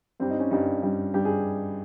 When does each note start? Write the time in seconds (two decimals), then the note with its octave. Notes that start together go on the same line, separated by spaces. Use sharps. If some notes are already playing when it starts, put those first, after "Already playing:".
0.20 G2 G3 C4
0.30 D#4
0.40 C#4
0.50 G2 G3 D#4
0.83 G2 G3
1.14 G2 G3 G4
1.25 G#4